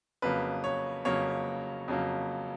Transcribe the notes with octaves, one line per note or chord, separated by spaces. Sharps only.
F2 C#3 F#3 A#3 B4
C#5
F2 C#3 F#3 A#3 C#5
F2 C#3 F#3 A#3